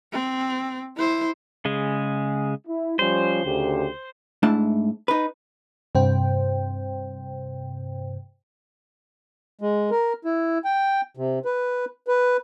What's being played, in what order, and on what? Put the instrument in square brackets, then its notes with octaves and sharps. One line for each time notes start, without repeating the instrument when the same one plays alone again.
[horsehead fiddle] C4
E4 C5
[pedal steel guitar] C#3 G#3
[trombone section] E4
[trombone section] F3 G3 C#4 [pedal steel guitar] C5
[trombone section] D2 C#3 G4
[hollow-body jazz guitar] G#2 A3 D4 E4 A5
D#4 B4
[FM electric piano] G2 C3 C5 G5
[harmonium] G#3
A#4
E4
G5
C3
B4
B4